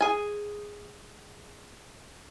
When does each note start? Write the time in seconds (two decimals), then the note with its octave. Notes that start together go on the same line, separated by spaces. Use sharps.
0.01 G#4 G#5